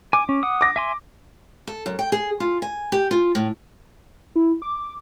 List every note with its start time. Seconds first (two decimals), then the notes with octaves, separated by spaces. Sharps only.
0.13 G#5 D6
0.29 C#4
0.43 F#5 D#6
0.61 D6 A#6
0.76 E5 G#5 C6
1.67 A4
1.86 F#2
1.99 G5
2.12 G#4
2.40 F4
2.62 G#5
2.92 G4
3.11 F4
3.35 A2
4.35 E4
4.62 D6